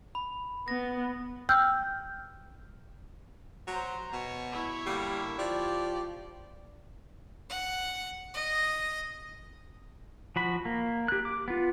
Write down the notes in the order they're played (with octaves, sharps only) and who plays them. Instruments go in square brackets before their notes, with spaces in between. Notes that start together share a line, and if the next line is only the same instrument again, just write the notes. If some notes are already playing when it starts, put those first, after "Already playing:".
[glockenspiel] B5
[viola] B3 [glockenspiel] A#6
[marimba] G5 E6 F6 G6
[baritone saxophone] F#3 [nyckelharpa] C5 A#5
[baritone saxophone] B2 [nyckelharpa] C#5
[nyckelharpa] E4 C#5
[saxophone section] D3 A#3 [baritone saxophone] G3
[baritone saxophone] F3 [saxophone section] G4 D5
[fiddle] F#5
D#5
[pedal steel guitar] F3 F#4 B5
A#3
G4 F#6
D6
B3 F4